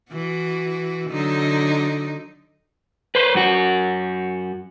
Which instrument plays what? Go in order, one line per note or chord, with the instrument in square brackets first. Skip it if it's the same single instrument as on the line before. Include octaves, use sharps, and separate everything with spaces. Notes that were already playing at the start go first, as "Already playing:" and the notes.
[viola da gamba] E3 F#4
D3 F#3 D#4
[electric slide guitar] B4 C5
F#2 F#4